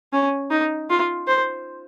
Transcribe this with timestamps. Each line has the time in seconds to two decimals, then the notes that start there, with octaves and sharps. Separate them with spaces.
0.13 C#4
0.51 D#4
0.90 F4
1.28 C5